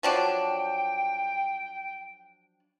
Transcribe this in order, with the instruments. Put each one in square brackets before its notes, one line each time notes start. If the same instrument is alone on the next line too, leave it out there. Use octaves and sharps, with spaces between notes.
[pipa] F3 F#3 D4 [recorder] G5